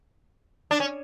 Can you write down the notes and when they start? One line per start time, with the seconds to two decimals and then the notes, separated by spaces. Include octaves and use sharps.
0.71 D4
0.80 C#4